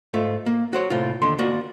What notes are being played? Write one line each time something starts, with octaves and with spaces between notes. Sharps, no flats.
G#2 A3 F4
A#3
F#4 C5 C#5
A2 C3 F4
D#2 D3 C6
A#3 F4 F#4 D5